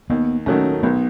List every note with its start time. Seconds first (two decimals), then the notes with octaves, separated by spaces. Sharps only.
0.10 D#2 B3
0.46 D#3 F#3 A3 C#4
0.83 B1 B3